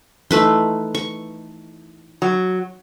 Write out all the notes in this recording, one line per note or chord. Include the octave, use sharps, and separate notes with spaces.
E3 A3 D#4 B4 C6
C#6
F#3